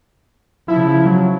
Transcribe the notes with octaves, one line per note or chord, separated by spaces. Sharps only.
C#3 F3 E4
F#3